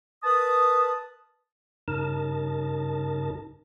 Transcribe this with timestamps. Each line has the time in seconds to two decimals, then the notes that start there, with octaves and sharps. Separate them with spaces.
0.23 A#4 B4 A5 D#6
1.88 G2 C#3 D#4 A#4 A5